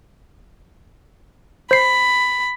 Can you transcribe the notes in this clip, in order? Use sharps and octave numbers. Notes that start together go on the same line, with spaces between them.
C5 B5 C7